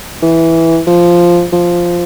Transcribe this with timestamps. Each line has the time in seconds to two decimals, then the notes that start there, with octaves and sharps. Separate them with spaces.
0.22 E3
0.87 F3
1.52 F3